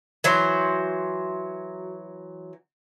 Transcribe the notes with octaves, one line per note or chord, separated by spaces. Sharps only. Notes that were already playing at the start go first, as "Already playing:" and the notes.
E3 F#3 C5